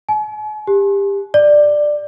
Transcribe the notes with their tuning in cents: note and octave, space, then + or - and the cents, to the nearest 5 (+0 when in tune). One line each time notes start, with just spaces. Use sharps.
G#5 +45
G4 +25
D5 +15